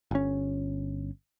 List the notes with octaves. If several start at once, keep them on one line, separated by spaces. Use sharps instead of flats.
G1 C#4